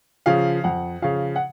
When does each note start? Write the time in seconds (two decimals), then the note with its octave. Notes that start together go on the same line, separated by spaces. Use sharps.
0.26 C#3 F3 F5
0.64 F2 F#5
1.02 C#3 F3 F5
1.36 F#5